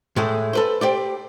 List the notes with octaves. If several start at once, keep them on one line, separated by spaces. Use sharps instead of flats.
A2 G#3 A3
A4 B4 C5
G4 C5 D5